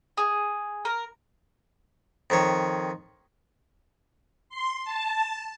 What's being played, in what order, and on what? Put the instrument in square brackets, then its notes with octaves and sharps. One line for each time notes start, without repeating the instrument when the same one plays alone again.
[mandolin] G#4
A#4
[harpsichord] F2 D#3 C#5
[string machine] C6
A5